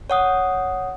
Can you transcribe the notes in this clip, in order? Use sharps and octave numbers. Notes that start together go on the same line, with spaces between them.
C#5 F#5 D#6